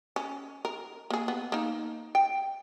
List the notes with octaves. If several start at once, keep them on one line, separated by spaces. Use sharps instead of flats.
C#4
A#4
A#3 G#4
B3
A#3 D#4
G5